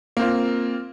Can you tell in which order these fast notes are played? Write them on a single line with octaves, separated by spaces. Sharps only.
A#3 C4 F4